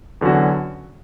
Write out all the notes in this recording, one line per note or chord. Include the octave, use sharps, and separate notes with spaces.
E2 D3 F#3 C#4 F#4